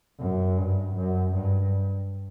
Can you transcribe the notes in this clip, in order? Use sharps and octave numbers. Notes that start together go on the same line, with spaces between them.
F#2
G2
F#2
G2